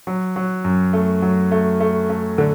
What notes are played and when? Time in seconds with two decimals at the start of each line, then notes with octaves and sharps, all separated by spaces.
0.07 F#3
0.36 F#3
0.64 F#2
0.93 A3
1.22 F#3
1.51 A3
1.80 A3
2.10 A3
2.38 D3